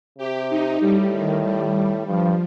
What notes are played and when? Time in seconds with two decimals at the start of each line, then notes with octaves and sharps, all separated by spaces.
0.18 C3 G4
0.50 D#4
0.81 A2 G3
1.12 D#3
1.44 G3
2.07 G2 F3